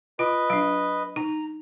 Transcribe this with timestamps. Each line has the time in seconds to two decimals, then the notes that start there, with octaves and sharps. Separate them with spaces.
0.19 F4 B4 D#5
0.50 F#3 D4
1.16 D#4 A#5